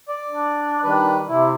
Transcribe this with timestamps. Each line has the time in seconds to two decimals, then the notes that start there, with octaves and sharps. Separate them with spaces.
0.08 D5
0.29 D4
0.84 D#3 G3 B4
1.28 C3 E4